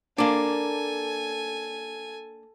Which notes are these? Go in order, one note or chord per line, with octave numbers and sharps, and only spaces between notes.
A#3 D4 A4 G#5